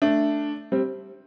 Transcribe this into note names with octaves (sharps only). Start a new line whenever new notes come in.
A3 D4
G3 C4